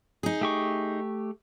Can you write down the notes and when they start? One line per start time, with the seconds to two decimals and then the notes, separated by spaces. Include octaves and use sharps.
0.23 D#4 G#4
0.41 A3 G4 C#6